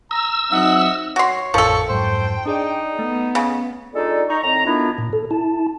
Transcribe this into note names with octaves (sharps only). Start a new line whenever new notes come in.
A#5 E6
F#3 C4 D#4 D#5 E5 F#5
F#4 C#5 C6
A1 F2 F3 A4 A#4 C#6
F2 G#2 F#3 C5 G5
D4 D#4 G#4 D5
A3 B3
C#3
G#3 D4 D#4 F4 A4 D5
D#4 A#5 C#6
A2 D#3 C4 A#5
D#3 A3 B3 D4 E4 F4
A#2
A4
E4 A5